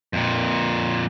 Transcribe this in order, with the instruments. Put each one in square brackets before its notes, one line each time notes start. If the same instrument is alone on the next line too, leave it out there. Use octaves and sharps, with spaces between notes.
[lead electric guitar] F2 A#2